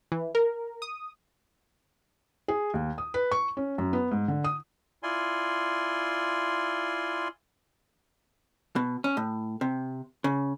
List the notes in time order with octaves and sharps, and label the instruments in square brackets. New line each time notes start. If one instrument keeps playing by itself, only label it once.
[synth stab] E3
A#4
D#6
[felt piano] G#4
D#2
D#6
B4
C#6
C#4
F#2
B3
G#2
D3
D#6
[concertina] E4 F4 D5 G#5 C6
[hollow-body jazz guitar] B2
C#4
A2
C3
C#3